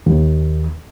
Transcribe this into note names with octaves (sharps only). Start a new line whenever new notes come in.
D#2